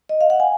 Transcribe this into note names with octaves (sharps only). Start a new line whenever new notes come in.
D#5
F5
F#5
G#5